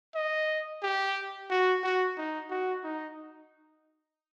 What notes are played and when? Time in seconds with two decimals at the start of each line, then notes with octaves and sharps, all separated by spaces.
0.15 D#5
0.83 G4
1.50 F#4
1.83 F#4
2.17 D#4
2.50 F#4
2.84 D#4